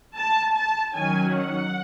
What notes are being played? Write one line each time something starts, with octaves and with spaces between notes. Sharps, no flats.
A5
A5
D#3 F#3 C#4 G#5
F#5